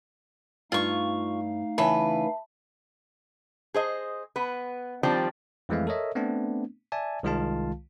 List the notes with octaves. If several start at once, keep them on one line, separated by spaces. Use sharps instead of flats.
G2 A3 D#4 F4 F5 C#6
C#3 E3 B4 E5 A5 B5
G#4 C5 D#5
B3 B4
D#3 F3 G3 C4 D4
F2 E3 G#3 A3 F5
A4 A#4 C#5 D#5 E5
A3 B3 C4 D4
D5 E5 G#5 A5
C2 D#3 G#3 F4 F5 A5